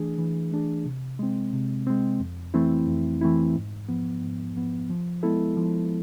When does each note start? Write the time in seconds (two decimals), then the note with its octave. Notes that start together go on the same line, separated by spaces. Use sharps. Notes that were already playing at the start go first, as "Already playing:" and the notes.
Already playing: E3 A3 D4 G#4
0.18 E3
0.52 A3 D4 G#4
0.86 C3
1.19 G#3 C4
1.53 C3
1.87 G#3 C4
2.20 F2
2.54 E3 A3 C4 E4
2.88 F2
3.21 E3 A3 C4 E4
3.56 G#2
3.89 F3 B3
4.22 G#2
4.56 F3 B3
4.90 F3
5.23 G#3 B3 E4 A4
5.57 F3